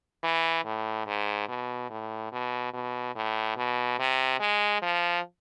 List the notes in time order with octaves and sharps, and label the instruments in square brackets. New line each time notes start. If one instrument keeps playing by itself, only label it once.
[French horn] E3
A2
G#2
B2
A2
B2
B2
A2
B2
C3
G#3
F3